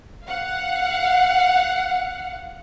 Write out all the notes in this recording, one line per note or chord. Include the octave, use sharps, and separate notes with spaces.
F5 F#5